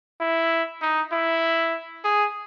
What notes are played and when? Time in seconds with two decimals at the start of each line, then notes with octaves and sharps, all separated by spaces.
0.21 E4
0.82 D#4
1.12 E4
2.04 G#4